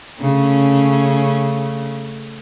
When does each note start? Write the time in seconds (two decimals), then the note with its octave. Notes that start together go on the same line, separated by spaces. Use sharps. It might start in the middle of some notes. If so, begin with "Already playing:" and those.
0.20 C#3 A3 C#4